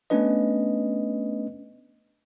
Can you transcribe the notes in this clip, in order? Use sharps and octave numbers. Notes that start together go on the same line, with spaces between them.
A3 B3 C#4 D4 B4 D#5